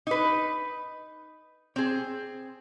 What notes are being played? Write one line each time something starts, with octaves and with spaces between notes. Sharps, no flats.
D#4 B4
C4 G#4